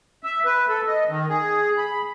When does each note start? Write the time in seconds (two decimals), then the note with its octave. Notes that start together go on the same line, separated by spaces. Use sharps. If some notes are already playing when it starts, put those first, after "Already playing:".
0.23 E5
0.45 B4
0.69 A4
0.87 D#5
1.09 D#3
1.29 G#4
1.78 B5